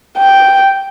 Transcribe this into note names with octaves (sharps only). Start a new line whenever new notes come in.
G5